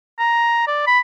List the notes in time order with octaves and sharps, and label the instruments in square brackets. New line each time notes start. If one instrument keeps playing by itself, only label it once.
[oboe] A#5
D5
B5